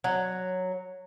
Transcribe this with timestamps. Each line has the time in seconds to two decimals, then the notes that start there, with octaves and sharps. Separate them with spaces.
0.04 F#3